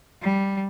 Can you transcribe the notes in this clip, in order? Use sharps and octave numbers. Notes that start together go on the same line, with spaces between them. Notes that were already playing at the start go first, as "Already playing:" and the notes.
G3